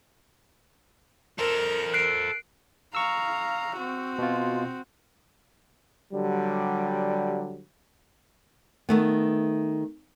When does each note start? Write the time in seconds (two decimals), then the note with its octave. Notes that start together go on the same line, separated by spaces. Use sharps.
1.38 A4 A#4 C5
1.94 F#6 C7 D7
2.95 F5 A#5 C#6 E6
3.77 C4 F#4
4.19 B2 F4
6.14 D3 F#3 G3
8.89 D#3 A3 B3